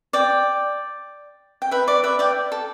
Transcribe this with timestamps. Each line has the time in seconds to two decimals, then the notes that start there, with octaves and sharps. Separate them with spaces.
0.13 D5 G5
1.62 G5
1.71 B4 E5
1.88 D5
2.04 B4 E5
2.19 D5 G5
2.52 A4